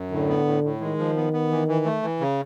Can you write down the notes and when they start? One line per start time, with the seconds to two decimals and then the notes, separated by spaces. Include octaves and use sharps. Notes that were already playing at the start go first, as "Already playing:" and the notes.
Already playing: F#2
0.11 A2 D3
0.29 B3
0.46 A2
0.63 A2
0.81 D#3 G#3
0.98 F3
1.16 B3
1.33 B3
1.51 E3
1.68 E3
1.85 A3
2.02 E3
2.21 C#3